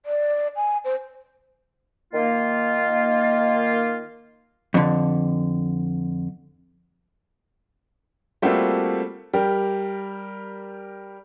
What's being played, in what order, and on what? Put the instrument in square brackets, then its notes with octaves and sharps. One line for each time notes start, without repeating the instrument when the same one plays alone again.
[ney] D5
G#5
C5
[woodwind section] D#3 A#3 F4
[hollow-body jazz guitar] F2 D3
[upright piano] G3 A3 A#3 C4 F4 F#4
G3 G4 A#4